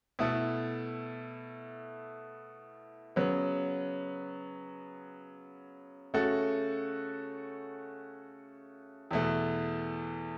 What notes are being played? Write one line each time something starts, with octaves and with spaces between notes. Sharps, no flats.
B2 A3 E4 A4
C#3 F#3 B3
C#3 A3 F#4 A4
E2 B2 A3